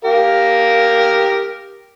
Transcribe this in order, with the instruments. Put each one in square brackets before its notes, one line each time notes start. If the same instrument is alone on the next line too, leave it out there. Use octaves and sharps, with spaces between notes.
[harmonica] G4 A#4 F5